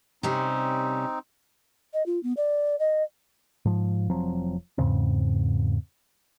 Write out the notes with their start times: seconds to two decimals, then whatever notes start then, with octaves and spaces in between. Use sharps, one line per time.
0.23 C3 G3 C4 C#4 D#4
1.93 D#5
2.06 F4
2.23 B3
2.37 D5
2.79 D#5
3.65 G#2 F3
4.10 F1 F3 F#3 C4
4.78 E2 G#2 C#3 C4